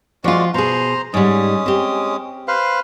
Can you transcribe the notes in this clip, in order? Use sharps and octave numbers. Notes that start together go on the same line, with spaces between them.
F3 G#3 F4 F#4 D5
B2 G#4 C5 A#5
G#2 G3 G#3 C#4 D#6
C4 G4
B4 C5 F5